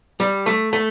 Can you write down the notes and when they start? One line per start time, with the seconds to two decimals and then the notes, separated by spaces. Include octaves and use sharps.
0.20 G3
0.46 A3
0.73 A3